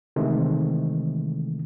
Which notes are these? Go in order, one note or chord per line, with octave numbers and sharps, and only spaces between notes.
C3 D#3 E3 G#3 A3